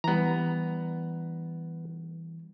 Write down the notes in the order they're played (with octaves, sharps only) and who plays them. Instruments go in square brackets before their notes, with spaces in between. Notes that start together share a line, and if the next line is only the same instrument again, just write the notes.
[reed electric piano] E3 G3 [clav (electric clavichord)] B3 A#5